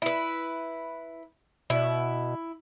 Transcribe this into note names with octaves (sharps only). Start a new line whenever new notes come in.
E4 B4
B2 E4